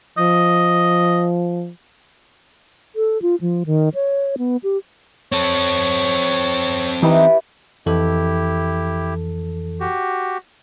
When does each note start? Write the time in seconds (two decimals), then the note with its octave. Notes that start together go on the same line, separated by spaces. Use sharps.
0.18 F3 D#5
2.96 A4
3.22 F4
3.41 F3
3.66 D#3
3.95 C#5
4.38 B3
4.63 G4
5.32 C4 A4 C#5
7.03 E3 D#4 E4 G4 B4
7.86 F2 E3 E4 G4 A4
9.80 F#4 G4